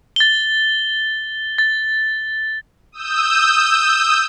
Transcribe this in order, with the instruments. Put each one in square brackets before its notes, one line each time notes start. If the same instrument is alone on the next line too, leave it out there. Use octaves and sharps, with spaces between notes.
[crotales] A6 G7
A6
[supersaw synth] D#6 E6 G6